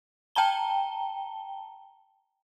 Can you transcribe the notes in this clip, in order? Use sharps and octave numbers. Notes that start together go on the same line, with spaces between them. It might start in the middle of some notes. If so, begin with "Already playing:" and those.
G5 A5 A#5 G7